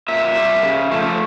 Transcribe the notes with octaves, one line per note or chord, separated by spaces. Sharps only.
A#2 E5
G3
C#3
F3 A3